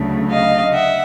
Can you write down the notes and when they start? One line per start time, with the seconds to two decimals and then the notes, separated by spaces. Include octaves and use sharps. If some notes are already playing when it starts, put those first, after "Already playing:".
Already playing: D2 C#3 F#3 A3
0.31 D#5 F5
0.73 E5 F#5